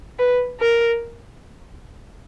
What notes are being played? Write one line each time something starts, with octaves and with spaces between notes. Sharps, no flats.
B4
A#4